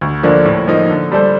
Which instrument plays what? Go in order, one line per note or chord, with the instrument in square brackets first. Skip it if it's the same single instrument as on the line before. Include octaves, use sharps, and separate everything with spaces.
[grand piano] D2
D3 F3 A#3 D4
A2
F3 A#3 D#4
D3
G3 D4 A4 C5